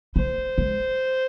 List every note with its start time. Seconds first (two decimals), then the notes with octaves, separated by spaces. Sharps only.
0.16 A3 C5
0.58 G#3